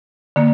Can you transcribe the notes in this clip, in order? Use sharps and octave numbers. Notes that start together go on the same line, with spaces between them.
D3 A#3